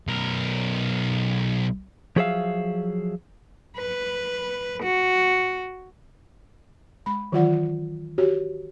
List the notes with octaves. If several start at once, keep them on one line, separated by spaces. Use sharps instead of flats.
B1 A#4
F3 F#3 G#4 C5 E5 F5
B4
F#4
G#3 B5
D#3 E3 F#3 F4 D5 F#5
F#4 G4 C#5